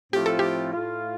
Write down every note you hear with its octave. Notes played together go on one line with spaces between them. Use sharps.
A2 F3 A3 C4 F4 G4
A4
G4
A2 A3 F4